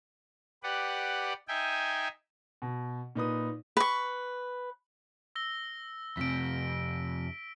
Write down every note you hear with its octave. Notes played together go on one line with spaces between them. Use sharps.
G4 B4 D5 F#5
D#4 E5 G5 G#5
B2
A#2 D#4 B4 D#6
B4 C#6
E6 A#6 G7
F2 C3 B6 D7